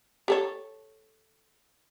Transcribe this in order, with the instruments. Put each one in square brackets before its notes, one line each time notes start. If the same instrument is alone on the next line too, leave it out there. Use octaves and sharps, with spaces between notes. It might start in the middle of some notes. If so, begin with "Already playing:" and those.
[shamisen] G4 A4 C#5